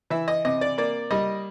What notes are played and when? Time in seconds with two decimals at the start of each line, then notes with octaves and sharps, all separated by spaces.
0.10 E3 E5
0.28 D#5
0.45 C3 D#5
0.61 D5
0.78 A#3 D5
1.11 G3 D#5